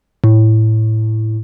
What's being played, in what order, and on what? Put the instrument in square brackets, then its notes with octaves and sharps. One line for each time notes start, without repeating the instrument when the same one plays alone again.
[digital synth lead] A2